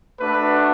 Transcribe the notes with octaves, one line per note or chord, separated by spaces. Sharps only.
A3 D4 F#4 B4